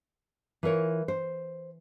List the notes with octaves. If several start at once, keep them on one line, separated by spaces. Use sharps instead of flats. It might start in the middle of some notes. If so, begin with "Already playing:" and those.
E3 F4 A#4 C#5
C5